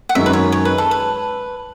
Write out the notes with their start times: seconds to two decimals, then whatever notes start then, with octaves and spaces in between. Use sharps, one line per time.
0.09 F#5
0.15 F#2 D#3 G#3 C#4 E5
0.26 B4
0.33 C#5
0.52 C#5
0.65 B4
0.78 A4
0.91 B4